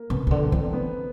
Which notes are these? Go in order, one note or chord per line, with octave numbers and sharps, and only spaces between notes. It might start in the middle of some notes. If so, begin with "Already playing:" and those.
Already playing: A#3
C#3 B3
C#3
D3 C4
E3 C4
B3